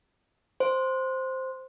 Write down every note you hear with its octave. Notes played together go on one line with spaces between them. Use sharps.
C5